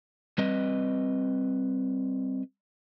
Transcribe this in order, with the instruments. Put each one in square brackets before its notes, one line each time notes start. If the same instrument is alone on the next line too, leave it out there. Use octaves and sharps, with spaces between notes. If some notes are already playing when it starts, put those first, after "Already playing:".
[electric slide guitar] G3 C4 B4 D#5